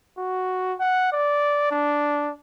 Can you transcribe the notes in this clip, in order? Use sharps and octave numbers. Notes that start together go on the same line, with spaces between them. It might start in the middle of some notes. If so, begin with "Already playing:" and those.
F#4
F#5
D5
D4